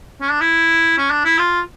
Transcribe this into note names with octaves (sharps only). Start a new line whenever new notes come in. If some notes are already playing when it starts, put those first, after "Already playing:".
C#4
D4
E4
C#4
D4
E4
F4